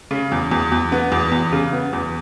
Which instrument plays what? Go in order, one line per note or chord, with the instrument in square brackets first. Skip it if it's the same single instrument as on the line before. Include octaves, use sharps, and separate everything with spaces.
[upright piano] C#3
E2
E2
E2
B3
E2
E2
C#3
B3
E2